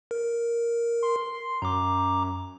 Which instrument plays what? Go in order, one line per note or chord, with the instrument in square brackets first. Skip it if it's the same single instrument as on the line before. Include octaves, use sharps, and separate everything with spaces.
[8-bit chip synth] A#4
[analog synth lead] C6
[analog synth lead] F#2 [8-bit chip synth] A#5 D6